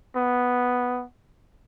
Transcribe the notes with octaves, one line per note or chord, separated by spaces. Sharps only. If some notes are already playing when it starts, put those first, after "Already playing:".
B3